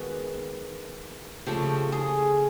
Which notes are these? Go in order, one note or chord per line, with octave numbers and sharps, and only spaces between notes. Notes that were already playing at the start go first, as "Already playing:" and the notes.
Already playing: D#3 G#3 B3 F#4
C#3 F3 A3 G4
G#4